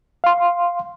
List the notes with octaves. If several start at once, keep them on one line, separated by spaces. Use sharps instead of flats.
F5 C6